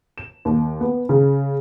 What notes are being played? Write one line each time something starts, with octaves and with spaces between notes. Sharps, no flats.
E7
D#2
B3
C#3